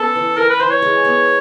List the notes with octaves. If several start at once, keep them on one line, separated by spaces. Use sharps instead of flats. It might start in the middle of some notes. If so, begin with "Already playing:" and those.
Already playing: B3 C#4 A4
E3
E3 A#4
B4
E3 C5
C#5
G#3
B3